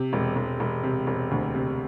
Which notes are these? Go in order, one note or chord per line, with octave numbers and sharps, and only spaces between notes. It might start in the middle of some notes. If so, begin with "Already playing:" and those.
Already playing: C3
E1
E1
E1
C3
E1
D2
C3